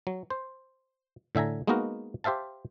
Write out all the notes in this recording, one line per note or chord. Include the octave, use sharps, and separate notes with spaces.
F#3
C5
A2 D3 E5 G#5 A#5
G#3 A#3 B3 D#4 F#4 A#4
G4 C5 E5 F5 A5